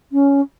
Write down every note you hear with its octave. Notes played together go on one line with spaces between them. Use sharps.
C#4